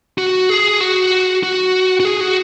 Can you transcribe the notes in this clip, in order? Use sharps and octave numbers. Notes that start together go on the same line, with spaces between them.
F#4
G#4
F#4
F#4
F#4
G#4
F#4